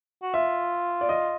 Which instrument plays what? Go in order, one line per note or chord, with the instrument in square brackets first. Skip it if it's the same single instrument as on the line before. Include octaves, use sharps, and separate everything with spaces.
[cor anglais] F#4
[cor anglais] F4 [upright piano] E5
[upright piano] D5
D#5